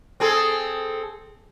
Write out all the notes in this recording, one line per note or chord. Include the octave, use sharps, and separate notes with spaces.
C4 G#4 A4